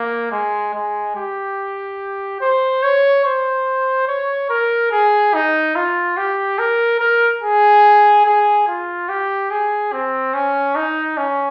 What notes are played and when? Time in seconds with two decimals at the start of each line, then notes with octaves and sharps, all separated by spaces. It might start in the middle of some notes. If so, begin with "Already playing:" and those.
Already playing: A#3
0.32 G#3
0.74 G#3
1.16 G4
2.41 C5
2.83 C#5
3.25 C5
4.08 C#5
4.50 A#4
4.91 G#4
5.34 D#4
5.75 F4
6.17 G4
6.59 A#4
7.00 A#4
7.43 G#4
8.25 G#4
8.67 F4
9.09 G4
9.50 G#4
9.93 C4
10.34 C#4
10.76 D#4
11.17 C#4